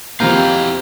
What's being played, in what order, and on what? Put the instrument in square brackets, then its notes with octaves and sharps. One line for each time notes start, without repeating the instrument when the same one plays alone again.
[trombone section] F2 G4 [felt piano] F3 C4 G6 [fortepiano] A#3 [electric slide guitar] E4 F5